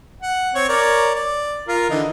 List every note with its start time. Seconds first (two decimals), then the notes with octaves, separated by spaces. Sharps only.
0.23 F#5
0.55 C4 C#5
0.69 A#4 C#5 D5
1.15 D5
1.68 F4 A#4
1.90 D3 E3 D#4